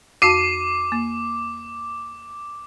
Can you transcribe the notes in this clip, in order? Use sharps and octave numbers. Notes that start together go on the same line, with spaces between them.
F2 F#4 A5 D6 C7 D#7
A#3